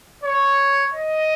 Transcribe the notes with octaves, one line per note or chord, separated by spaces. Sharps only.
C#5
D#5